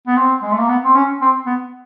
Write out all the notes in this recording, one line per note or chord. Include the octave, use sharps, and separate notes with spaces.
B3
C4
G#3
A3
A#3
B3
C4
C#4
C4
B3